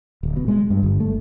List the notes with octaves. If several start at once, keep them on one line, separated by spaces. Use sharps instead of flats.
D1
B2
G#3
G2
G1
A3